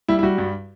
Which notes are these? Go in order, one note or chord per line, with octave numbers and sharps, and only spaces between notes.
G3 E4
E4
G3 F#4
G2